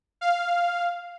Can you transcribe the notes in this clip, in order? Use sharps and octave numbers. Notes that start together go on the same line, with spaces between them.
F5